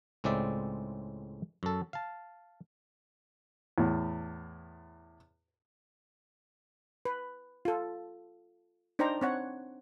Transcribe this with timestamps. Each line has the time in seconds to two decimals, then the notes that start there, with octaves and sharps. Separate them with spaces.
0.24 C#2 A2 G#3 C4 D5 E5
1.63 F#2 A4
1.93 F5 A5
3.78 E2 A2
7.05 B4
7.65 F4 A4
8.99 D4 D#4 C5 D5 G5 A#5
9.21 C4 C#5 F#5